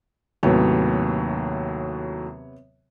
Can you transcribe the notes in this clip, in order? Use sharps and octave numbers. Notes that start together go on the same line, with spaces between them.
D#2 A2 C3 F#3 B3 C#5